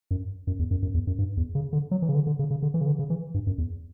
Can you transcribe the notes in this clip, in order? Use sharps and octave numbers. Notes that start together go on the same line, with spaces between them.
F#2
F#2
E2
F#2
F#2
E2
F#2
G2
E2
C#3
D3
F#3
E3
C#3
D3
D3
C#3
C#3
D3
E3
C#3
D3
C#3
E3
G2
F#2
E2